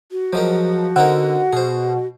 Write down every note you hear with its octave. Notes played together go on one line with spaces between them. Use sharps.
F#4
F3 F#3 G#3 A#4
D3 C4 D#4 A#4 F#5
B2 G#4 C5